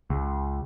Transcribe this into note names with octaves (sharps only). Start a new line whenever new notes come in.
C#2